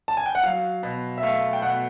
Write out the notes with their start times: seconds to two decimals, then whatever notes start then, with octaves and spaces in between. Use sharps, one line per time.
0.08 A5
0.17 G#5
0.26 G5
0.35 F#5
0.44 F#3 F5
0.83 B2
1.18 E5
1.23 A3 F5
1.53 G5
1.62 B2 F#5